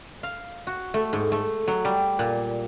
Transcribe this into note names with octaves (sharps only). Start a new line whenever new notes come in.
F5
F#4
A3
G#2
A3
F#3
G3
A#2